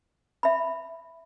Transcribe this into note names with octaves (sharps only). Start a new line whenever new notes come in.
E5 B5